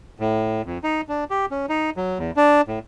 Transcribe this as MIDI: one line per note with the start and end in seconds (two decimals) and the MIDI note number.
0.20 0.62 45
0.66 0.78 41
0.84 1.01 63
1.09 1.24 62
1.30 1.46 67
1.51 1.66 61
1.69 1.90 63
1.97 2.18 54
2.19 2.31 40
2.37 2.61 62
2.68 2.79 45